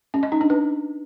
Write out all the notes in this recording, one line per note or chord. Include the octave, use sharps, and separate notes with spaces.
C#4
D#5
D#4
D4
B4